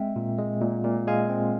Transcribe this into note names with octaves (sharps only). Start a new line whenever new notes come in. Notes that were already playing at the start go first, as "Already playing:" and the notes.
Already playing: G#3 C4 E5 G5
A#2
G#3
A#2
A#2
G#3 F5 G#5
C4